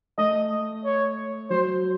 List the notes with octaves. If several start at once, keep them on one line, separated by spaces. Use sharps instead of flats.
A3 D#5
C#5
F#3 C5